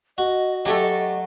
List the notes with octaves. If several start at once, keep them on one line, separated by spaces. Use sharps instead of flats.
F#4 D#5
F#3 A3 G4 A4 G#5